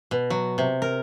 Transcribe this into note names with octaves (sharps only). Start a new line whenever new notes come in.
B2
F#3
C3
A#4